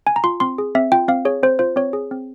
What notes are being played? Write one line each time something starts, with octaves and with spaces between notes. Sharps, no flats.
G#5
A#5
F4 C6
C4 C6
G#4
C4 E5
F4 G5
C4 F5
G#4 C#5
C4 C5
F4 C5
C4 C#5
G#4
C4